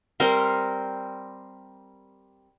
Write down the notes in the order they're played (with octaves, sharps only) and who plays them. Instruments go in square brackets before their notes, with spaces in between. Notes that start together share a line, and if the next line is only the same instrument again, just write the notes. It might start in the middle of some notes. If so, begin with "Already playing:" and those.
[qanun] G3 C4 A#4 C6